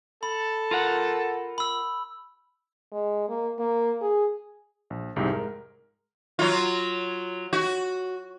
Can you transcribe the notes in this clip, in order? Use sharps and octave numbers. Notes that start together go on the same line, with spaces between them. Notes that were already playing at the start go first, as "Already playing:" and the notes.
A4 B5
F4 A#4 F#5
B5 E6
G#3
A#3
A#3
G#4
A#1
C2 F2 G#2 C3
G#3 A#4
F#3 F4
F#4